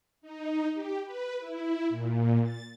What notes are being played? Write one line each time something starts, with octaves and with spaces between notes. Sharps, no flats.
D#4
G4
B4
E4
A#2
A6